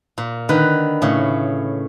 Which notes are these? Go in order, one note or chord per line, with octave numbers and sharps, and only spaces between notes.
A#2
D3 D#3 B4
A2 C#3